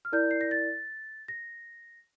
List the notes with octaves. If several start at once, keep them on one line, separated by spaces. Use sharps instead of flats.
F6
E4 A#4 D5 G6
C7
A#6
A6
A#6